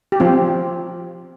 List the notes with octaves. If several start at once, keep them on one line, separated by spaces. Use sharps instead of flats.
G4
F3 C4 F4